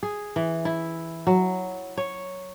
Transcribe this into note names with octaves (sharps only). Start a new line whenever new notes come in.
G#4
E3
E4
F#3
C#5